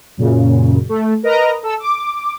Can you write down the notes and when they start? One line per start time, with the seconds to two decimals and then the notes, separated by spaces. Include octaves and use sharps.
0.17 F#2 A#2 C#3
0.89 A3
1.23 A#4 B4 D#5 A#5
1.63 A4 E6
1.80 D6